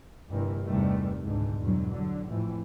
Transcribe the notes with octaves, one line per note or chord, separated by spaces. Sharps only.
G1 G2 C3 E3 A#3
E2 G2 C3 D#3 G3 A3
C#2 G#2 B2 D3
E2 G2 B2 D3 F#3
D3 F#3
F2 A2 E3